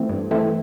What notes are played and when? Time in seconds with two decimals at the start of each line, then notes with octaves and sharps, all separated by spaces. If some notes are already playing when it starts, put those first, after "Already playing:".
Already playing: E3 A3 C4
0.09 G2
0.31 E3 A3 C4